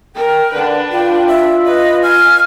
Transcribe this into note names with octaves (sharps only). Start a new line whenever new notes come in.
A#4 G5
D3 D4 B4
F4 G5
E5
B4 D#5
G#5 F6